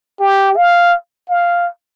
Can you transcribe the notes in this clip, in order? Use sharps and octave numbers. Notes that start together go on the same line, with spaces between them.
G4
F5
F5